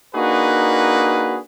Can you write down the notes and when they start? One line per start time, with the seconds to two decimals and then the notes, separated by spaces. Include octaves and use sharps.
0.15 A#3 D4 D#4 F#4 G#4 B4